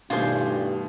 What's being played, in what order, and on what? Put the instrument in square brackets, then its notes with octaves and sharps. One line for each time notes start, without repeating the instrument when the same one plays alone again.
[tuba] G2 [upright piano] B2 D#3 A3 [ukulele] D4 C5 [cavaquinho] F4 G#5